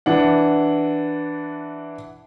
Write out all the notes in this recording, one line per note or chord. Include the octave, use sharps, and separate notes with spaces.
E3 D4 F#5